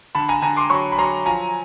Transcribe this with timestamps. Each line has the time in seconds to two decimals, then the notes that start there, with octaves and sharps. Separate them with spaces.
0.15 D3 A5 B5
0.29 G#5 A#5
0.42 D3 G#5 A#5
0.57 C6 D6
0.70 F#3 B5 C#6
0.92 B5
0.98 F#3 A#5 C6
1.26 F3 G#5 A#5